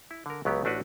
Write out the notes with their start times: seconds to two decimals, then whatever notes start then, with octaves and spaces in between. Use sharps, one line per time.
0.11 E4
0.26 D3 A#4
0.45 C#2 F#3 B3 G4
0.64 A1 A3 D4 F#4 B4